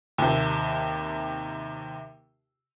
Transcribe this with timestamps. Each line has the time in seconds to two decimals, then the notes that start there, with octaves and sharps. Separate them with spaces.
0.18 D#2 C3